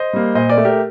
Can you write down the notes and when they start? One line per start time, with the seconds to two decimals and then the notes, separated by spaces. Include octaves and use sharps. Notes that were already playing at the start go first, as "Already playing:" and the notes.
Already playing: C5 D#5
0.13 G3 A#3
0.35 A#2 C5 D#5
0.50 A#4 D5
0.57 A3
0.65 G4 A#4